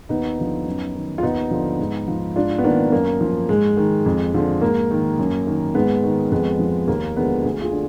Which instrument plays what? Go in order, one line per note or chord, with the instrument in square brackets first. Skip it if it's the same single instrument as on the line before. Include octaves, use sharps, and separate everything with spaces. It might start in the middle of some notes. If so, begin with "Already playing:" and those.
[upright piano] D#2 B3 D#4
D3 F3
F#2
D#3
F4
D#2 B3 D#4
D3 F3
G#2
F3
G#2 D4 F4
B3
D#3 A#3 D4
F#2 A#3
F3
G#2 G#3
D#3
F2
D3 F3
G#2 A#3
D#3
F#2
D#3
G#2 G#3 B3
D#3
F2 G#3 B3
F3
D#2 A#3
D3 F3 G#3 B3
D2 G#4
F4 G#4
D3